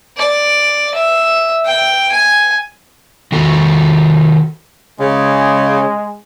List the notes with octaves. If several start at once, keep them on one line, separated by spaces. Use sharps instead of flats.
D5
E5
G5
G#5
D#3 F#4 A4
C#3 G#3